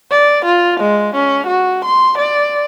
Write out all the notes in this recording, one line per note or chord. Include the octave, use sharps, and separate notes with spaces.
D5
F4
G#3
C#4
F#4
C6
D5